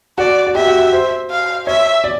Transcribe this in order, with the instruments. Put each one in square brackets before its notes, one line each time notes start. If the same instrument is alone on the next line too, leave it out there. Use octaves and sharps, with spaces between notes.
[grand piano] F#4 [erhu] D5
[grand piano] F#4
[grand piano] G4 [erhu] E5
[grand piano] F#4
C5
[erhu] F5
[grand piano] C#5 [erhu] E5
[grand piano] D5